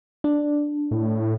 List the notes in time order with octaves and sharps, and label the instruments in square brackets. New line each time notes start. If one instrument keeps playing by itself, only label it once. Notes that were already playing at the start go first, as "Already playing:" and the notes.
[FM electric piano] D4
[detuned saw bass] A2